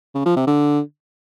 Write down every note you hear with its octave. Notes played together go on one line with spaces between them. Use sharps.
C#3
F3
C3
D3